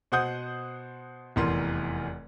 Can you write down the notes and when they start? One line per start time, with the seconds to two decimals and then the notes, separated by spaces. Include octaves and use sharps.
0.12 B2 C5 F#5 D#6 G6
1.36 F1 E2 E3 A#4 C6